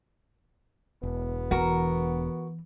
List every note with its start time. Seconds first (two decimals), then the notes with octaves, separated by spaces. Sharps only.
1.03 E1 B3
1.51 E3 F#4 A#4